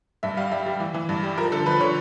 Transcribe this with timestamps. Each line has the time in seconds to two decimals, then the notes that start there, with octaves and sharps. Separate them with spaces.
0.23 G2 E5
0.37 G3 F5
0.52 G3 E5
0.66 G3
0.80 E3
0.94 E3
1.09 G2
1.23 G3
1.38 F3 A#4
1.52 D3 A4
1.66 F3 B4
1.80 D3 C#5